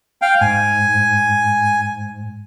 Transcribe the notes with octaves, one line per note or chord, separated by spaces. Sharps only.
F5 G5
G#2 G#5